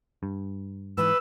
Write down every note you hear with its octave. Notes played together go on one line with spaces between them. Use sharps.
G2
G#2 E3 B4 E6